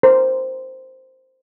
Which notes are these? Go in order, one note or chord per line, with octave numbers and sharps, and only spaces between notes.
A#4 C5